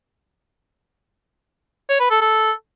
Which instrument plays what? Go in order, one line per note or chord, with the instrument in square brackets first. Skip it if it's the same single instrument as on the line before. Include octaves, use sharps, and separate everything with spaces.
[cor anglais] C#5
B4
A4
A4